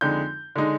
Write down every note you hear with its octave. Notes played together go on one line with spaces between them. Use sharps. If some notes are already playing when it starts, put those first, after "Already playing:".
F2 D3 G#3 D#4 G6
D3 G#3 D#4